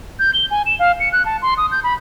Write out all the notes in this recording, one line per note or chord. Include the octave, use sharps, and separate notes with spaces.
G6
G7
G#5
E7
F5
C#7
F#6
A5
C6
D#6
G6
B5